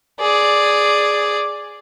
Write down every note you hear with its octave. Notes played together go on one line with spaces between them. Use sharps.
G#4 D5